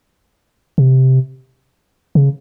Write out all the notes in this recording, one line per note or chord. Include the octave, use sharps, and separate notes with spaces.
C3
C#3